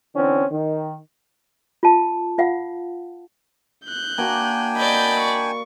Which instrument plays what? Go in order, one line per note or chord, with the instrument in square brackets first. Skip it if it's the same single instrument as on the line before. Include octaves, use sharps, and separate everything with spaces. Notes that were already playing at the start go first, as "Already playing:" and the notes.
[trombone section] D3 E3 C4 C#4
D#3
[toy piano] F4 A5
F4 F5 F#5
[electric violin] F#6 G6
[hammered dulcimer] A#3 F#4 [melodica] D4 G5 G#5
[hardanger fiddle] D5 B5 [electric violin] D#5 G6
[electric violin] C#6